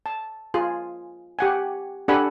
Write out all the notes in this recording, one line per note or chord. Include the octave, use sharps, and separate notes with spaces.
A5
F4 G#4
G4 F#5 G#5
D4 G4 A4 F#5 G#5 B5